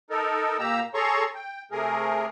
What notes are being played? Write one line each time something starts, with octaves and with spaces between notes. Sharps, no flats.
D#4 A4 A#4
A#2 A#3 G4 A#5 E6
G#4 A4 C#5 A#5 C6 C#6
G5
C3 A3 G#4 A#4